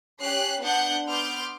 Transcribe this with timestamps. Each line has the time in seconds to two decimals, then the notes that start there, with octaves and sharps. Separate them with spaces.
0.21 C#4 G4 F#6 C7
0.61 B3 D4 F#5 G6
1.07 B3 C6 D6 F6 G6